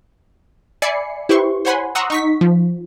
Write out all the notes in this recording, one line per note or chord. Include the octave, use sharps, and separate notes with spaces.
D5 E5 G#5 B5 C7 C#7
E4 G4 B4 C5 C6 C#6
C5 C#5 F#5 G#5 B5 C6
F#5 A#5 C6 C#6 D#6 E6
D#4 C#6 B6
F3